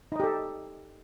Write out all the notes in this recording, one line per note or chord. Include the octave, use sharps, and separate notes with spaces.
D#4 G4 A4 D#5